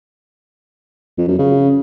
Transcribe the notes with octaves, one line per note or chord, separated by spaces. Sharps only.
F2
F#2
C#3